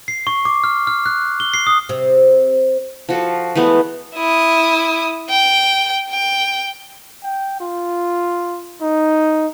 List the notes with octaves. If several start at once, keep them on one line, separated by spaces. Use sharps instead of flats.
C7
C#6
D6
F6
F6
F#6
G7
C7
D#6
C3
F3 F#4 A4
E3 G#3 A3 B3
E4 D#6
G5
G5
G5
F4
D#4